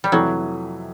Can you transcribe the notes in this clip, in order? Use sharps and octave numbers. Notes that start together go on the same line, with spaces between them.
G3
F2 C3 E3 F#3 A3